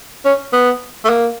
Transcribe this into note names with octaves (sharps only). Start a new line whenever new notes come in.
C#4
B3
A3
A#3